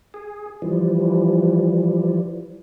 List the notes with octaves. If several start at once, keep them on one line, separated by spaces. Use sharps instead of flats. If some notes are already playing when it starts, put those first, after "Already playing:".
G#4
E3 F3 G3